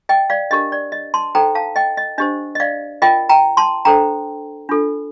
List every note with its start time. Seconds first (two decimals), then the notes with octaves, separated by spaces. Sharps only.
0.09 D#5 G5
0.30 D5 F5
0.51 D4 G4 A#4 D#5
0.72 D5
0.92 D#5
1.14 A5 C6
1.35 D#4 A4 C5 G5 A#5
1.55 F5 A5
1.76 D#5 G5
1.97 D#5
2.18 D4 G4 C5 D#5
2.55 D#5
2.60 D5 F5
3.02 F4 A#4 D#5 G5
3.29 G5 A#5
3.57 A5 C6
3.85 D4 A4 C5 G5 A#5
4.69 D4 F4 A4